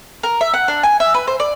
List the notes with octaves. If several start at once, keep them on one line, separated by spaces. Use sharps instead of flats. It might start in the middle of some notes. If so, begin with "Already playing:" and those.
A#4
E5
F#5
D4
G#5
E5
B4
C5
D5